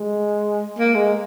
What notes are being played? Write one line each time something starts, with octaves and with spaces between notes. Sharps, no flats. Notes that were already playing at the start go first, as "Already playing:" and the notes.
Already playing: G#3
A#3
G#3